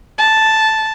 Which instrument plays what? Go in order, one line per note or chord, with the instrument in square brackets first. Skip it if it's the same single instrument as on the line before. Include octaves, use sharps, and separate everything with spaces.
[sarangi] A5